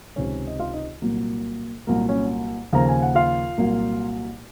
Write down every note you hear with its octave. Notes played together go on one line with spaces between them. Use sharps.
C#2 C3 D#3 C#4 C#5
D#5
F4 F5
D#4 D#5
C2 A#2 F#3 A#3
C2 A#2 F#3 A#3 A#4
C#4 C#5
D#2 C#3 F3 A#3 A#5
G#5
F#5
F4 F5
C2 A#2 F#3 A#3